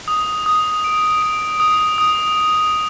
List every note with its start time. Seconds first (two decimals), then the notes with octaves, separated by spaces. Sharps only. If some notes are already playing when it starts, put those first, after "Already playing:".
0.08 D#6
0.46 D#6
0.84 D7
1.22 D7
1.60 D#6
1.98 D#6